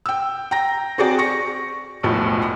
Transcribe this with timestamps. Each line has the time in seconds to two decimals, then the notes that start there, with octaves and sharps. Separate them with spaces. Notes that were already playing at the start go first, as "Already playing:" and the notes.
0.06 G5 E6
0.51 G5 A#5 A#6
0.98 C4 F#4 G#4 D5 G5
1.18 C#6 A#6 C#7
2.03 E1 B1 A2 F3